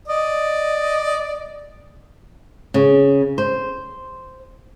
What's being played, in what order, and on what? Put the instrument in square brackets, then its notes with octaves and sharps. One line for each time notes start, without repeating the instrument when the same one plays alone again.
[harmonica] D5 D#5
[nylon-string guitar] C#3
C5